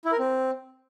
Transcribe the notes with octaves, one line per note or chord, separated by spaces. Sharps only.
E4
A#4
C4